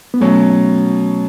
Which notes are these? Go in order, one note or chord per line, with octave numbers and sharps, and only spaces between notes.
B3
B2 F#3 A3 C#4